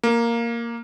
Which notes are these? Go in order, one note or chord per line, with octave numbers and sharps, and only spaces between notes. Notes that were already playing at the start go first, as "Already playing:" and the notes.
A#3